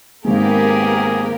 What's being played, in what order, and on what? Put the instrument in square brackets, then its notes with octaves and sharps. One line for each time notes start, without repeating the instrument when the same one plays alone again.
[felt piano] G#1 G#3 [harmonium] A#3 [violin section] B3 G4 A#4 [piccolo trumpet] G#4